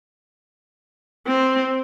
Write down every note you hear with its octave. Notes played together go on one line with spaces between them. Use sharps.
C4